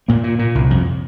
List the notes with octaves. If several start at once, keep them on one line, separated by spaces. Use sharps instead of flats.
A#2 A#3
A#2
A#2
C2
F2